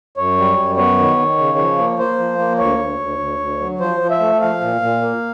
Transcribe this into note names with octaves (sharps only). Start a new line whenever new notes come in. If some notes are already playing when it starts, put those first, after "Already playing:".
F#2 C#5
G3
F#2
B3 C#5
D#3
D#3
C#3
F3
A#3
A#3 C5
F3
A#3
D2 C#5
D2
D2
D2
D2
F#3
F3 C5
F3
E5
A3
F3 F5
A#2
A#2
A#3